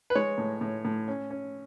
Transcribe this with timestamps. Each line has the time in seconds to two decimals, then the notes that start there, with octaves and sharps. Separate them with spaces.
0.10 B4
0.15 G#3 C#5
0.38 A2
0.61 A2
0.85 A2
1.08 C#4
1.31 C#4